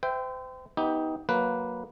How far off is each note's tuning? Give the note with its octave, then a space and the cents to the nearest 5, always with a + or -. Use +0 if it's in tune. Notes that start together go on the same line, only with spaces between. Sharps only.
C5 -35 E5 +0 G5 +0
B3 +0 D#4 +25 G4 +5
F#3 -10 A#3 +0 B4 +0